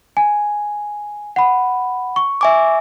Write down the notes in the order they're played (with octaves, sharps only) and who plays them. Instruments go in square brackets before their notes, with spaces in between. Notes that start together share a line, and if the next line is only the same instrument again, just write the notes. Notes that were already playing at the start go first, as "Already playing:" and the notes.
[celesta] G#5
F#5 B5
C#6
[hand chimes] E5 G#5 D6